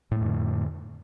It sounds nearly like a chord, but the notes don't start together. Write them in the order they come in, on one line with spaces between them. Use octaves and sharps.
A2 A3 F2 D3